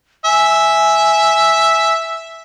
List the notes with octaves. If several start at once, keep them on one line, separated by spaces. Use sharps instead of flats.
E5 G#5